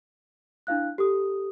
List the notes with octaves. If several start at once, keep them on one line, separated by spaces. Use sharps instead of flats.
D4 E4 F5 F#6
G4 A4 D#6